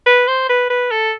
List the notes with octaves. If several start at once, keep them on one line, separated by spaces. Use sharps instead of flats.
B4
C5
B4
B4
A4